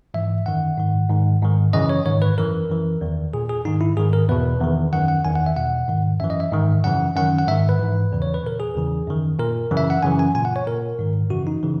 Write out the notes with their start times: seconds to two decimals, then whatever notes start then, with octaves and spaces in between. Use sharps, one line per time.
0.14 G#2 E3 E5
0.46 F#2 D#3 F#5
0.78 G#2 D#3
1.10 G#2 D#3
1.42 G#2 D#3
1.73 F#2 C#3 E3 D#5
1.89 C#5
2.05 G#2 D#3 C#5
2.22 B4
2.38 F#2 E3 A#4
2.69 F#2 E3
3.01 E2 D#3
3.33 A#2 G#4
3.49 G#4
3.65 G#2 D#3 D#4
3.81 E4
3.97 G#2 D#3 G#4
4.13 A#4
4.29 E2 B2 B4
4.61 E2 D#3
4.93 F#2 D#3 F#5
5.08 F#5
5.25 E2 D#3 G#5
5.35 F#5
5.46 E5
5.56 E2 B2 F#5
5.88 G#2 D#3
6.20 F#2 E3 E5
6.30 D#5
6.40 E5
6.52 G#2 D#3
6.84 F#2 C#3 E3 F#5
7.16 F#2 D#3 F#5
7.38 F#5
7.48 G#2 E5
7.51 D#3
7.69 B4
7.79 G#2 E3
8.12 E2 C#3 E3
8.22 C#5
8.34 B4
8.43 A#2 A#4
8.60 G#4
8.75 E2 C#3 E3
9.08 F#2 D#3
9.39 A#2 A#4
9.71 F#2 C#3 E3
9.77 E5
9.90 F#5
10.03 F#2 C#3 E3 G#5
10.19 G#5
10.35 A#2 G#5
10.45 F#5
10.56 C#5
10.66 A#2 A#4
10.99 G#2 D#3
11.30 F#2 C#3 E3 F#4
11.47 D#4
11.63 C#3 E3